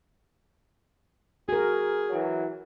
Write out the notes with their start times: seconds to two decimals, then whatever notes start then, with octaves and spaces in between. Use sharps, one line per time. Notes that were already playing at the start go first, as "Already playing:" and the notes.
1.49 F#4 G#4 A#4
2.10 E3 F#3